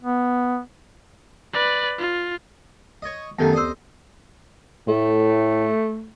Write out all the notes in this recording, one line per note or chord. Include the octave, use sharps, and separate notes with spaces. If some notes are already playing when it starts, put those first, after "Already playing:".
B3
B4 D5
F4
C#5 D#5
F#2 D#3 A3 B3 G4 A4
D2 C5 D#5 E6
A2 A3